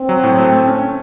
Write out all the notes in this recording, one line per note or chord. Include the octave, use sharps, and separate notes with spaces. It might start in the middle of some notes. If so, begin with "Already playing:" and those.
Already playing: C4
F#3
A2
A3
A3
C#4
C#4